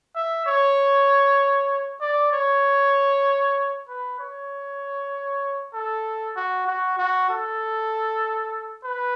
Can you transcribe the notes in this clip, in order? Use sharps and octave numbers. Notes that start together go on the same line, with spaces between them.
E5
C#5
D5
C#5
B4
C#5
A4
F#4
F#4
F#4
A4
B4